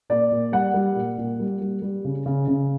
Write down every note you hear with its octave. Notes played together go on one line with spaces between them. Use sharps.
A#2 D5
A#2
G3 F#5
G3
A#2
A#2
G3
G3
G3
C#3
C#3
C#3